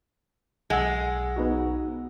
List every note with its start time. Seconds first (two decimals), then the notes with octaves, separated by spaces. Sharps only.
0.70 B1 G#3 F#5 E6
1.36 B3 D#4 F#4